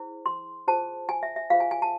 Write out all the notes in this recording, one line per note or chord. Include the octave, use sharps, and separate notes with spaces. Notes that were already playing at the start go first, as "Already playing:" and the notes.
Already playing: E4 G#4 C5
C6
F4 G#4 C5 A5
G#5
E5
E5
F4 G#4 C5 F5
G#5
G#5
A5